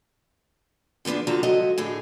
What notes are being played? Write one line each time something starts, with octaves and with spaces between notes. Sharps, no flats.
D3 F3 B3 D4 G#4
D3 F3 F#4 A5 A#5
F3 F#3 G#3 A3 F#4 D#5
A2 D3 D#4 G#4